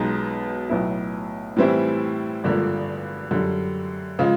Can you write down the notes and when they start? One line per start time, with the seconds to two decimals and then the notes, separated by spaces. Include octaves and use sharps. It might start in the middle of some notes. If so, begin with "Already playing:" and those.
Already playing: B1 B2 G#3 B3 D#4
0.69 B1 A2 F#3 B3 E4
1.56 A2 E3 G3 C4 E4
2.44 G#1 G2 D3 F3 A#3
3.31 F#2 D3 G3
4.19 C#3 F3 G#3